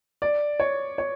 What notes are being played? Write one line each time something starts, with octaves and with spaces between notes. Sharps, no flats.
D5
C#5
C#5